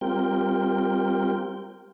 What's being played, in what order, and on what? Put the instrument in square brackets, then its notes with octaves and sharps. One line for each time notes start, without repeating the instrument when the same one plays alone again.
[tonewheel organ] G3 C4 F4 G4 A#4 G5